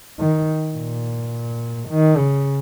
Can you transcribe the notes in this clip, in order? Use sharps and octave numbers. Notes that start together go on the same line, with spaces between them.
D#3
A#2
D#3
C#3